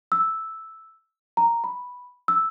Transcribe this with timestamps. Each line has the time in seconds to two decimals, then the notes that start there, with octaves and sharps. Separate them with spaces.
0.12 E6
1.37 A#5
1.64 B5
2.28 E6